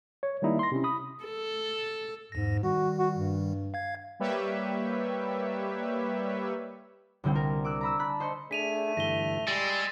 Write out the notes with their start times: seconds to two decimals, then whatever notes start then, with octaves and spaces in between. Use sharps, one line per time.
0.23 C#5
0.42 D#3 G3 A#3 D#4 E4
0.59 C6 A#6
0.72 C3 C#4 E4
0.84 B5 D#6
1.24 A4
2.32 E2 G#2 A#6
2.63 D#3 G3 F#4
2.98 F#4
3.13 G2
3.74 F5 G#6
4.20 G3 A#3 G4 B4 C#5 E5
7.24 C2 D3 G3 C4 G5
7.35 A#4
7.65 D6 E6 F#6
7.81 A#5 B5 E6
7.99 A5 B5 F#6
8.20 C5 D#5 C6 C#6 G6
8.51 A3 D4 G#4 B6 D#7 F7
8.97 G2 D3 E3 A#6 G7
9.47 G3 G#3 C6 E6 A6